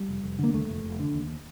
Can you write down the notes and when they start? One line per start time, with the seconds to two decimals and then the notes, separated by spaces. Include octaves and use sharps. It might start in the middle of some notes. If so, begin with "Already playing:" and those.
Already playing: G3
0.08 F1
0.23 F1
0.39 D3 A#3
0.53 D#2 A3
0.69 F1
0.84 F1
0.99 D3
1.14 D#2